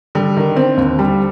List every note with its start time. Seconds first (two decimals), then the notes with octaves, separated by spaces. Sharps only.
0.15 D3 G3
0.37 D#3
0.56 C4
0.77 D#2
0.99 G3